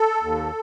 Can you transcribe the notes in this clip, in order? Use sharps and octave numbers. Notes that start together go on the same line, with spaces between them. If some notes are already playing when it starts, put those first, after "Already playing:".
Already playing: A4
D#2